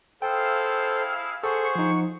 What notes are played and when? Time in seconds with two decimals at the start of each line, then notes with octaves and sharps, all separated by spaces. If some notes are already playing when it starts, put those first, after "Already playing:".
0.22 E4 G#4 A4 C5 F5 G5
1.44 G#4 A4 C5 F#5 C#6
1.75 F3 D#4